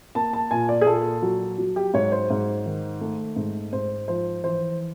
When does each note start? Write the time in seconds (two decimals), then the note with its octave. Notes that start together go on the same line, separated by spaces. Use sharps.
0.15 A#3 A5
0.33 A5
0.51 A#2 G#5
0.69 D5
0.81 G#4
0.86 A#2 A4
1.22 F#3
1.58 F#3
1.76 G4
1.94 G#2 C#5
2.12 C5
2.30 G#2
2.66 D#3
3.01 A3
3.36 G#2
3.73 G#2 C5
4.08 F3 C5
4.44 E3 C5